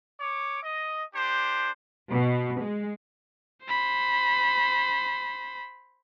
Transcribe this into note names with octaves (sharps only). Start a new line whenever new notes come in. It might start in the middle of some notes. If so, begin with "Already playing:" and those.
C#5 D6
D#5
D4 G4 C5
B2
G#3
C5 B5